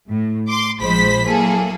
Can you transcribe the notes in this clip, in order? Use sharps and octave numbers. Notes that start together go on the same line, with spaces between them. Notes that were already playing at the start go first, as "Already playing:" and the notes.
A2
C6 D6
A#1 F3 G#3 C5 B5 B6
F#3 A#3 E4 G#4 A4